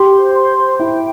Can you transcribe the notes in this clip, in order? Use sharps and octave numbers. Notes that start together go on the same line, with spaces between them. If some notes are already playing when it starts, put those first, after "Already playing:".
Already playing: G4 C6
C5
C6
C5
E4 G5